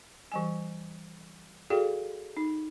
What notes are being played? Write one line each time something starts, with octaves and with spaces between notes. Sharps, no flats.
E3 G3 G#5
F#4 G#4 A4 D5 F5 G5
D#4